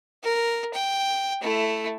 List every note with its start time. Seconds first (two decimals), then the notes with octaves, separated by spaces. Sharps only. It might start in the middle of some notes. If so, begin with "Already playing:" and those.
0.24 A#4
0.74 G5
1.42 A3 E4